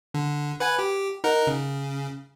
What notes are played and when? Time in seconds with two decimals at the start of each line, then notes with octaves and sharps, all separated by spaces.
0.14 D3
0.60 B4 F#5 G#5
0.79 G4
1.24 D#4 A#4 F#5
1.47 C#3